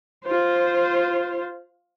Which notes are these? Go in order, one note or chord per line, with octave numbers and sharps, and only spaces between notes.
F4 C5